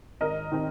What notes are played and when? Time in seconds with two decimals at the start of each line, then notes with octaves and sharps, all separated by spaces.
0.21 G#1 A#4 D#5
0.52 D#3 C4